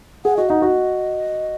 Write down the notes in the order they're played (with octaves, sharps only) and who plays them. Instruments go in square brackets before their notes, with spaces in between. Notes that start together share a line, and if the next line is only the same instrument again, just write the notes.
[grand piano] G#4 [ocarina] F#5
[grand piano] F#4 [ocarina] D#5
[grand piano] D#4 [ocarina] F#5
[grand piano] F#4 [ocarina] D#5